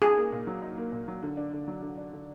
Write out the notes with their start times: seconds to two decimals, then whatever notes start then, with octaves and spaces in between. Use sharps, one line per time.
0.02 D#4 G#4
0.17 A#3
0.32 A#2
0.47 F#3
0.62 D#4
0.77 A#3
0.92 A#2
1.08 F#3
1.23 D3
1.37 D4
1.53 D3
1.68 F#3
1.82 D3
1.98 D4
2.13 D3